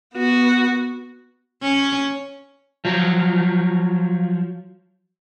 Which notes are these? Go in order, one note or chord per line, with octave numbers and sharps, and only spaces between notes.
B3 F#4
C#4
F3 F#3